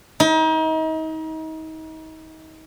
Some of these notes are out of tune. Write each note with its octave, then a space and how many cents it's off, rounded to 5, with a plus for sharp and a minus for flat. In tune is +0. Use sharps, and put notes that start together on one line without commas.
D#4 +35